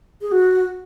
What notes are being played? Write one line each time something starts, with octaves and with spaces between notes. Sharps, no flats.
G#4
F#4